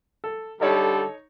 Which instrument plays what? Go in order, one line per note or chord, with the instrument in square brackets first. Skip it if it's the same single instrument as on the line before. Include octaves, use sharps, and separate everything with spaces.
[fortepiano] A4
[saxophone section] D3 G3 [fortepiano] D#4 C#5 [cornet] A4